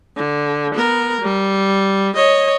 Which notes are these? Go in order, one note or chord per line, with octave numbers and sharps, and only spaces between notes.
D3
B3 A#4
G3
C#5 D#5